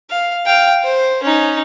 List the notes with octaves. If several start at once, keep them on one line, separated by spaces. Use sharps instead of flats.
F5
F5 G5
C5
C#4 D#4